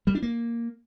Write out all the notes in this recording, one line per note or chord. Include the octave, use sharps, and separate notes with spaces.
G3
D4
A#3